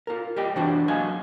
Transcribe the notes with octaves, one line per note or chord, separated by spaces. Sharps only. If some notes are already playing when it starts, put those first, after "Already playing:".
F4 A#4
G3 G4 D#5 G5
E3 B3 D4 F#4 C5
F#3 A#3 D#5 F5 G#5